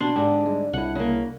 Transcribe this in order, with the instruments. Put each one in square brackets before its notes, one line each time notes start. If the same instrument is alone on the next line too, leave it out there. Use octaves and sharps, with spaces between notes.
[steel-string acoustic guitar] B2 [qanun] D4 [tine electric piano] C6
[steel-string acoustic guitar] G#2 D3 [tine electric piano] G4
[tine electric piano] G3 G#3
[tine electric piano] C2 E4 [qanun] F#5
[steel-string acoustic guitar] C#3 A#3